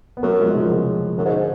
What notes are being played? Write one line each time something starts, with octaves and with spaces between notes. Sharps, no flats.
B3
F#2 F#3 A3
F3 G#3
C#3 F3
C#3 F3
F#2 D3
G#2